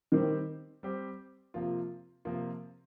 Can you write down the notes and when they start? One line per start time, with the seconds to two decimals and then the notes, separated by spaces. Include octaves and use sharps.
0.12 D#3 G3 C4 G4 C5
0.83 G3 C4 G4 C5
1.54 C3 F3 A#3 F4
2.25 C3 F3 A#3 F4